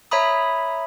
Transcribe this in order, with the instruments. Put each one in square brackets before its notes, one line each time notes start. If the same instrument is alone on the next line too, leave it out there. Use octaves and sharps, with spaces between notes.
[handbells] C#5 E5 A#5 B5 D#6